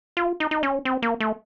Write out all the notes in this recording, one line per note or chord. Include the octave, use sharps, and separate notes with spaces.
F4
D#4
D#4
C#4
C4
A#3
A3